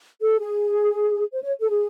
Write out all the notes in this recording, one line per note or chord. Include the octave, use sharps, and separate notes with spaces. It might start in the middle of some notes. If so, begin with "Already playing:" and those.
A4
G#4
C5
C#5
A4
G#4